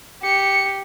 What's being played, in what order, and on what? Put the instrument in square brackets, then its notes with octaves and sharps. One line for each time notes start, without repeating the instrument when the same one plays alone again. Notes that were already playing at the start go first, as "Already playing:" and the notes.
[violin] G4 [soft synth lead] C#7